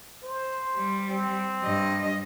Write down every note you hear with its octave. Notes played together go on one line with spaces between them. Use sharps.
C5
G3
C4
G2 D#5